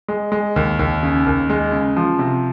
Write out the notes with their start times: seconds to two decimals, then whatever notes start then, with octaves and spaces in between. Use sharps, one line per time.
0.08 G#3
0.32 G#3
0.56 D#2
0.79 D#2
1.03 C#3
1.26 D#2
1.49 G#3
1.72 C#3
1.96 F3
2.19 C3